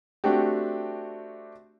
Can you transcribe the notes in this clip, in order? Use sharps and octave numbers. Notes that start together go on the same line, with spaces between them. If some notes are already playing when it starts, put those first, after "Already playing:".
A3 C4 D4 F#4 G4